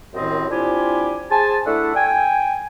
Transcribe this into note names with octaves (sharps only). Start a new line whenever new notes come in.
C2 F#2 A2 D#3 C4 D#5
C4 D4 E4 F4 G4 G#5
G#4 C5 G#5 A5
A3 D4 E4 A4 E5 F#5
G5 G#5